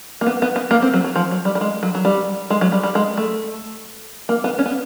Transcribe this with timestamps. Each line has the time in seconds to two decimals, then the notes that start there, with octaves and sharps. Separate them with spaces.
0.21 A#3
0.27 B3
0.42 B3
0.56 B3
0.71 A#3
0.82 C4
0.94 F#3
1.04 F#3
1.16 F3
1.31 F#3
1.45 G3
1.55 G3
1.61 G#3
1.83 F#3
1.95 F#3
2.05 G3
2.50 G#3
2.61 F#3
2.72 G3
2.83 G3
2.95 G#3
3.18 A3
4.29 A#3
4.44 B3
4.59 C#4
4.66 B3